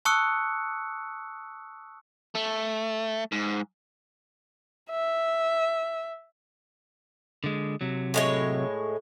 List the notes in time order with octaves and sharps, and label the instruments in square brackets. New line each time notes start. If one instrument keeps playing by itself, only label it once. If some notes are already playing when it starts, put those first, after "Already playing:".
[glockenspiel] A5 C#6 D#6 E6 F#6 C#7
[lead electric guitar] A3
G#2
[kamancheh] E5
[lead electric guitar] D3 G#3
C3 F#3
[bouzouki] A2 G#3 C#5